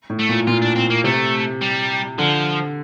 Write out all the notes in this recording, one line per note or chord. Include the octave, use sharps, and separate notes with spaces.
A2
A3
A#2
A#2 F4
D4
C4
A#3
C3 A3
G3
D3 F3